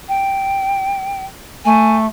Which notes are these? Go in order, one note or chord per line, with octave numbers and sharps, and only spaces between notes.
G5
A3 G#5